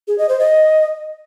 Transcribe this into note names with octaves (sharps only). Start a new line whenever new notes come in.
G#4
D#5
C5
D#5